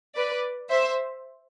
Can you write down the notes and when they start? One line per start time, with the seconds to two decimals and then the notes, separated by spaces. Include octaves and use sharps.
0.16 B4 D5
0.70 C5 E5